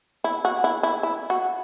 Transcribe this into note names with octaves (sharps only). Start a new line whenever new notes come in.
E4
F#4
E4
E4
E4
F#4